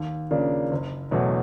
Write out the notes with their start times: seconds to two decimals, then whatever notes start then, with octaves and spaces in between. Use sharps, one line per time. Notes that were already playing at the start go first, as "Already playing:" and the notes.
Already playing: D#2
0.31 C#3 F3 A#3 D4
0.71 F#1
1.11 E2 B2 F#3 A3